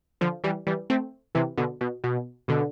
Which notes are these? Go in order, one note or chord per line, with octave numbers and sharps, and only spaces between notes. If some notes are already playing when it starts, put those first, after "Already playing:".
D3 F3
E3 G3
E3 G3
A3 C4
C3 E3
B2 D3
B2
B2
B2 D3